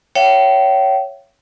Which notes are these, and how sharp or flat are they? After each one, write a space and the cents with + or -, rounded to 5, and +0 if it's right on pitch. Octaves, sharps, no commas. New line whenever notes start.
C#5 +0 E5 +45 G5 -40